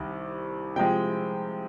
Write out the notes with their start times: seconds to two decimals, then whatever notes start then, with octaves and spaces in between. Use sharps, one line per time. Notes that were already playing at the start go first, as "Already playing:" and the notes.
Already playing: C2 C3 D#3
0.76 C3 F3 G#3 G5